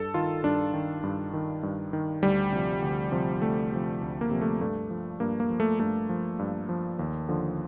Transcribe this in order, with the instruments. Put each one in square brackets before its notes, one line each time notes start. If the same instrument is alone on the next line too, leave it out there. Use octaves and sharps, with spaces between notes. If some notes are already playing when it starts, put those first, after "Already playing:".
Already playing: [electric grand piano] G2 A4
D#3 F4
G2 D4
D#3
G2
D#3
G2
D#3
D2 G3
C3 F3
D2
C3 F3
D2 A3
C3 F3
D2
A#3
C3 F3
A3
G2 A3
F3
G2 A#3
A#3
F3
A3
G2 A3
F3
G2
F3
D#2
D3 F3